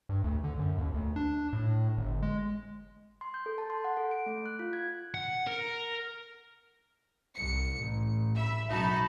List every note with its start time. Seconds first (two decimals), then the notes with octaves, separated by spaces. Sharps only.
0.09 G2
0.24 D2
0.44 D3
0.59 F#2
0.78 D#2
0.94 D2
1.16 D4
1.53 A2
1.98 G1
2.22 G#3
3.21 C6
3.34 G6
3.46 A4
3.58 A5
3.70 C6
3.84 F#5
3.97 A4
4.11 D7
4.26 A3
4.46 F#6
4.59 F4
4.73 G#6
5.14 F#5
5.47 A#4
7.35 C2 C#7
7.78 A1
8.35 E5 B5
8.70 B1 F#2 D#4 F#4 A5 B5